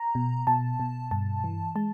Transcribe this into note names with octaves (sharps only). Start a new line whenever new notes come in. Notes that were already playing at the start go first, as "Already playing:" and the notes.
Already playing: A#5
B2
B2 A5
B2
G2 A5
E3
G#3 A5